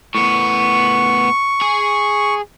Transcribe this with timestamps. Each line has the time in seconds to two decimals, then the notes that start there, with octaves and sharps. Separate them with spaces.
0.15 A2 B3 C#6
1.61 G#4